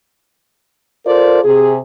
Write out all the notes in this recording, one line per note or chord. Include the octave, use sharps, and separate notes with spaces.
F4 A4 A#4 C5 D5
C3 G#4